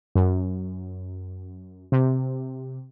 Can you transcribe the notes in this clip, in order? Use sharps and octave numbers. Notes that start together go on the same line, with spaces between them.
F#2
C3